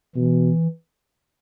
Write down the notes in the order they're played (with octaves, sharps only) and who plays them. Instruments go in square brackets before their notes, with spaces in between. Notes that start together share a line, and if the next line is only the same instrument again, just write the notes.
[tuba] B2 [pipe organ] E3